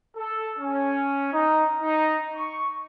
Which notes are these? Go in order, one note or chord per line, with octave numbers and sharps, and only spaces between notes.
A4
C#4
D#4
D#4
C#6